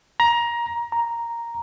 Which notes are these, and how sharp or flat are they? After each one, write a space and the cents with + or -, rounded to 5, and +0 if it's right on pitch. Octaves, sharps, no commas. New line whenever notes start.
A#5 +20
A#5 +0